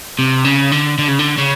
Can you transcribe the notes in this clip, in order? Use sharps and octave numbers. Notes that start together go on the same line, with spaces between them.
C3
C#3
D3
D3
C#3
D3
C#3